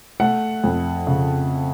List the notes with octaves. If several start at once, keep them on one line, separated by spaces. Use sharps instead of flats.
A3 F#5
F2
C#3